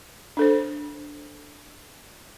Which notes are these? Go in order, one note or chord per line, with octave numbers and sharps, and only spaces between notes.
D4 A4 C5